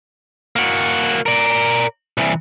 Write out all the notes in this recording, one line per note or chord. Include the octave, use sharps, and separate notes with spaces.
A#3 F#4
A#4 D5
C2 E3